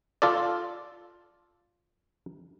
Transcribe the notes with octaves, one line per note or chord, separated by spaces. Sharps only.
F4 A4 D5